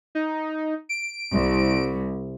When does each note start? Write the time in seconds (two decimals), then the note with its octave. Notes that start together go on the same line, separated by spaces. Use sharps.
0.15 D#4
0.89 D7
1.34 C2